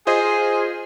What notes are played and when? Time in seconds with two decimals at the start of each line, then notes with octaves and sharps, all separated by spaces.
0.07 F4 G#4 C5 D#5